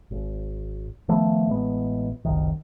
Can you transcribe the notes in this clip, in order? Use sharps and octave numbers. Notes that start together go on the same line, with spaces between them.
G#1
D#3 F3 A3 B3
A1 G#3 B3
F#1 C2 D#3